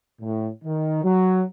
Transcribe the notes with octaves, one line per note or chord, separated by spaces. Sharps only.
A2
D#3
F#3